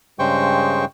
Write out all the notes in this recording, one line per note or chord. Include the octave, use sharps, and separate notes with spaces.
G2 C#3 G#3 C5 G5 C#6